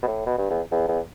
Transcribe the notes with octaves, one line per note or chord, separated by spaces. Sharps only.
B2
A2
B2
G2
E2
E2
E2